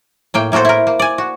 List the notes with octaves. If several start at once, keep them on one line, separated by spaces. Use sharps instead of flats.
A2 A#3 G5
A2 A#3 F#4 A4 C5
E4 A#4
A#3
D5 G#5
F#4